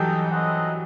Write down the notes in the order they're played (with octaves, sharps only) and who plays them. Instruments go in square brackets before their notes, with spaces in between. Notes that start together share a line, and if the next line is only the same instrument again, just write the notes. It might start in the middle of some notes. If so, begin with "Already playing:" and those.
Already playing: [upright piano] E3 F#3 G3 [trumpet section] D#4 A4 D#5 G5
[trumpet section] C4 D#4 A4 D#5 F#5